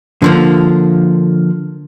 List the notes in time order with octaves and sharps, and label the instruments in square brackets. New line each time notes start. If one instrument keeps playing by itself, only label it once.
[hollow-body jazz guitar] D3 F3 A#3